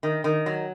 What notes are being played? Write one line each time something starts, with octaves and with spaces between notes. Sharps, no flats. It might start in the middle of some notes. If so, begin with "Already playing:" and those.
D#3
D#3
F#3